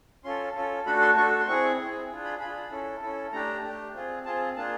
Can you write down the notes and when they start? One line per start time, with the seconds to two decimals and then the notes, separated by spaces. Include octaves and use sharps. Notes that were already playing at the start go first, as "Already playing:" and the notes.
0.24 C#4 F4 A4 C6
0.55 C#4 F4 A4
0.86 A3 D4 F#4 A4 B5
1.01 C6
1.17 A3 D4 F#4 A4 C#6
1.40 C6
1.47 C4 E4 G#4 C#6
1.79 C4 E4 G#4
2.10 D4 F4 G#4
2.25 B5
2.40 D4 F4 G#4 B5
2.71 C#4 E4 A4
3.02 C#4 E4 A4
3.33 A3 D4 G4 A#5
3.63 A3 D4 G4
3.94 C4 F4 G#4
4.25 C4 F4 G#4 A5
4.56 A#3 D4 F4 G#4 A5